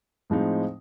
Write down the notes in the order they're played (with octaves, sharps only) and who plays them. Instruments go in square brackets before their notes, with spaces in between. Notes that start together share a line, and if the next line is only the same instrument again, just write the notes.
[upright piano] A2 F3 G#3 C4 D#4